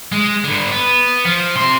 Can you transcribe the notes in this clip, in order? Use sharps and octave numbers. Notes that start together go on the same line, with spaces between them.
G#3
G2 D3
B3
F3
C3 C6